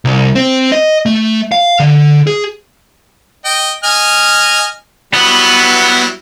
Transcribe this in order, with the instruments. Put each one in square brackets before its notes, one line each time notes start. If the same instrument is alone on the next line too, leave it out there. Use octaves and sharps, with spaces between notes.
[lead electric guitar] C2
C4
D#5
A3
F5
D3
G#4
[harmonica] D#5 G5
D#5 G#5 F6
[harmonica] F#3 G3 E4 [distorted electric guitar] B3